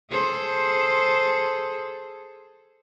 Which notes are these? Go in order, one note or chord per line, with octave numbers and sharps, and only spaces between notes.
G#4 A4 C5